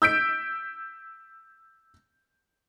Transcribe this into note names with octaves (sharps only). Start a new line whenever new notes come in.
E6 G6 B6 D7